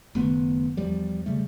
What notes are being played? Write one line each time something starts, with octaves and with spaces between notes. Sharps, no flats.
F#1 D#3 A3 B3
E2 F3 G3
C#3 G3 A3